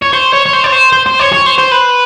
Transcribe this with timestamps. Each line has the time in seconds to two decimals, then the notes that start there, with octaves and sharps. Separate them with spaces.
0.02 C#5
0.13 C5
0.33 C#5
0.46 C#5
0.53 C5
0.64 C#5
0.72 C5
0.93 C5
1.06 C5
1.19 C#5
1.32 C#5
1.46 C5
1.58 C5
1.71 B4